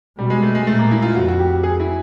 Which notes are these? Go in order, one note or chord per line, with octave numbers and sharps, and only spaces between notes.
B2 G3
G#3
A3
G#3
A#2 A3
A#3
E4
F4
F2 F#4
F#4
G4
G#4
E4